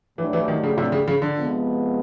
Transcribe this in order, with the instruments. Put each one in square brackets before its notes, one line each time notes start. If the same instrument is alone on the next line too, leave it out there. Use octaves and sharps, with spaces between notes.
[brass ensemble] A2 F#3 A3 D4 G4 [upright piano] E3
[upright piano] E3
D#3
C#3
C3
C#3
C#3
D3
[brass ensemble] C3 F3 G#3 B3